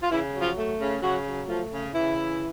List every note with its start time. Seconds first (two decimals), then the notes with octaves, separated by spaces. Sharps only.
0.03 F4
0.11 C#3 E3 E4
0.34 F#3
0.41 F3 F4
0.57 A3
0.80 C#3
1.02 C#3 F#3 F#4
1.26 F#3
1.48 F3 A3 F4
1.72 C#3
1.94 C#3 E3 E4
2.17 E3